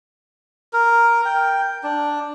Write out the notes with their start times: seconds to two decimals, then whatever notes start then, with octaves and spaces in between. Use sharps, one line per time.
0.73 A#4
1.25 G5
1.83 D4